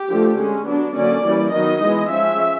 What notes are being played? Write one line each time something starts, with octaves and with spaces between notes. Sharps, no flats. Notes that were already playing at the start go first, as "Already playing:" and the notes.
Already playing: G4
D3 F3 A3
G#3 C#4
F#3 B3 D4
D3 F#3 A#3 C#4 D5
E3 G3 A#3 C#4
D#3 F#3 B3 D#4 D#5
E3 G#3 B3
F3 G#3 C#4 E5